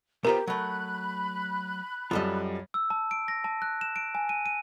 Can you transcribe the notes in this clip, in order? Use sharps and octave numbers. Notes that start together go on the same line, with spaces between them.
B3 F4 G4 A#4 C5 A#5
F#3 A3 B5 F#6
F#2 G3 F4 A4 D#5
E6
A5
D7
A#6
A5
F#6
E7
D7
G#5
D#7
D#7